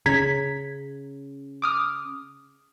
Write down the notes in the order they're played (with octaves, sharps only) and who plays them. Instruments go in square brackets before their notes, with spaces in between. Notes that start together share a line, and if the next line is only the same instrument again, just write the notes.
[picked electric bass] C#3 [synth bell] C#4 G#4 [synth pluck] A#5 G#6 B6
[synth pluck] D6 D#6 F6